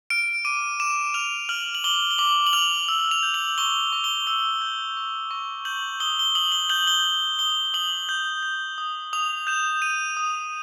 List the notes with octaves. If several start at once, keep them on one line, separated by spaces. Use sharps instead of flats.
F6 D7
D6 D#7
D6 E7
F6 F7
F6 F#7
F#7
D6 G7
G7
D6 F#7
F#7
F6 F7
E6 F#7
F7
G6
F#7
C#6 G7
C#6
G7
E6
G6
C#6
C#6
G6 F#7
D#6 G7
G7
D#6 F#7
G7
G6 F#7
G7
G6
D#6 G7
D#6 F#7
G6
G6
D#6
D#6 F7
G6 E7
G6 D#7
D#6